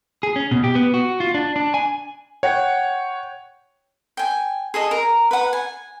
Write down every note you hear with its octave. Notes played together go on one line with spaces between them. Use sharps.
G#4
C#4
B2
G4
B3
F#4
F4
D4
D4
G#5
C#5 F#5 G5
G5 G#5
G#4 A4 D#5
A#4
B4 F#5
G#5